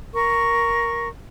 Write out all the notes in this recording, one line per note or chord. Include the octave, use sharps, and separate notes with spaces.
A#4 C#6